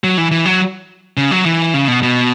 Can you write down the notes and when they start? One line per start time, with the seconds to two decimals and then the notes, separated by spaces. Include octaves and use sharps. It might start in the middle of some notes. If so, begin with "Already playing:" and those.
0.04 F#3
0.18 E3
0.31 E3
0.46 F#3
1.17 C#3
1.31 F#3
1.45 E3
1.74 C#3
1.88 B2
2.03 B2